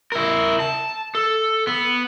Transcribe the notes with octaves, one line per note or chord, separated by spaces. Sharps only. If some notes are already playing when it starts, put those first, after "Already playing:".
E4 A#4
A5
A4
B3